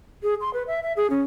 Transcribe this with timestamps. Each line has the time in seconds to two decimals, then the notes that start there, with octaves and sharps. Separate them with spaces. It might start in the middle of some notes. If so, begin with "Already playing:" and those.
0.23 G#4
0.41 C6
0.54 B4
0.67 E5
0.83 E5
0.97 G#4
1.10 C#4